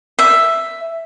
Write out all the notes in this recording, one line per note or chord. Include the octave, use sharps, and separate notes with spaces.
E5